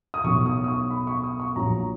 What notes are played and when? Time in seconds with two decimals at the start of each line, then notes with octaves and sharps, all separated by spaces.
0.14 D#6
0.24 B1 B2 F#3 C#6
0.46 D#6
0.64 D#6
0.68 C#6
0.91 B5
1.07 C#6
1.24 D#6
1.40 C#6
1.56 A#1 A#2 F#3 A#5